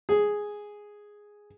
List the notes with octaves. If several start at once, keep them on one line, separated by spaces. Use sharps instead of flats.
G#4